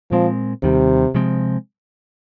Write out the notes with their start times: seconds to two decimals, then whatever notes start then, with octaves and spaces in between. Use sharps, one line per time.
0.11 A#2 F3 G#3 C4
0.63 D#2 C3 D#3 G3
1.15 C3 F3 G#3 C4